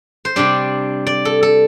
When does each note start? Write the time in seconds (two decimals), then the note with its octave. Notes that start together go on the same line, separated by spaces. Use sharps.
0.25 C5
0.36 C3 G3 D4 D5
1.07 D5
1.25 A4
1.43 A4